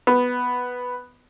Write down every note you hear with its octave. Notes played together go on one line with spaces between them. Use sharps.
B3